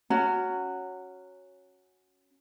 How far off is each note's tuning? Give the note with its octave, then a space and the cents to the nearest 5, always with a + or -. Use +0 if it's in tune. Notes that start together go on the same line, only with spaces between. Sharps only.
C#4 +0 F#4 +0 A#5 -25